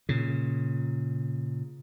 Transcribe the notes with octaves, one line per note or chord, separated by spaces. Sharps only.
A#2 C#3